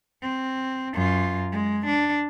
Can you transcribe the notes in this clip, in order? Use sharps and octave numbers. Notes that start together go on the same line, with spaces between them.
C4
F#2 F4
G#3
D4